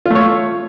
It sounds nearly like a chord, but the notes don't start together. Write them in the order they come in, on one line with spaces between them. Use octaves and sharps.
F4 A3 C#5